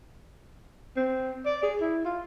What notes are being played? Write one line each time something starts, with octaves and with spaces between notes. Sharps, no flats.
C4
D5
G#4
E4
F4